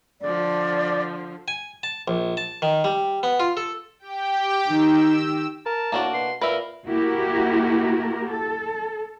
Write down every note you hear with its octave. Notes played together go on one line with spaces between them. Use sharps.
D3 F3 D5
G#5
A5
A#1
A5
D#3
G3
B3
F4
A4
G4 G5
D#3 D#4 E6
A#4 A5
A2 A#3 D4 F#4
B2 C6
A#2 A#4 B4 E5
A#3 E4 F#4 G4 A#4
A4